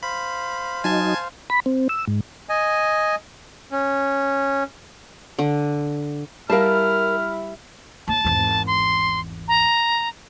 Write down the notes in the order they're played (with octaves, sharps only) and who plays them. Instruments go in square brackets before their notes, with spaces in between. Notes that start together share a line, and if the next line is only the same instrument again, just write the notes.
[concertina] C5 F5 [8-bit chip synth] B5
[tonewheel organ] F#3 D#4 [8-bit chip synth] G#5 A5 G#6
[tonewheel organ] B5
C4
E6
G#2
[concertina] D#5 G#5
[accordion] C#4
[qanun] D3
[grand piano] G3 [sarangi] E4 [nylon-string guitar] A#4 F5 A5 [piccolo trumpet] F6
[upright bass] D#2 [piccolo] A5
[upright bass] G#1 E2
[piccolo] C6
A#5